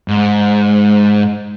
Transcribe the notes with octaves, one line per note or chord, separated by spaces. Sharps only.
G#2